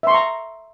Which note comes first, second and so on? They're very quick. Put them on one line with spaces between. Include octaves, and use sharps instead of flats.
E5 C6 C#6 A#5